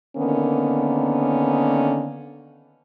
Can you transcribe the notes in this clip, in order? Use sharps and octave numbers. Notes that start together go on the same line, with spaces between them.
D3 D#3 A#3 B3 C#4